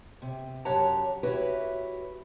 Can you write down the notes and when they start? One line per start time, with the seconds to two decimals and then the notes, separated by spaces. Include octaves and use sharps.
0.22 C3
0.65 F#2 G4 C#5 F#5 A5 A#5
1.23 E4 F#4 G4 B4 C#5